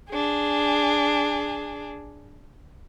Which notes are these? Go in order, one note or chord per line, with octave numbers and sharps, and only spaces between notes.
D4 G#4